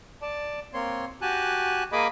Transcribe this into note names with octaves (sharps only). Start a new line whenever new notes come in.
D5 A5
A#3 C4 C#5 C6
F#4 G4 G#5 A5 F#6
A#3 G#4 D#5 G#5 B5 D6